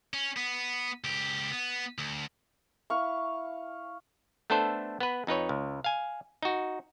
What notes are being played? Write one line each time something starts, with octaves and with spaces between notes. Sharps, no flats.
C#4
B3
C#2 G4
B3
D2
E4 F5 C#6
A3 B3 D4 A4 C5
B3 B4
F2 D#4 B4 C#5
C#2
F5 G#5
D#4 F#4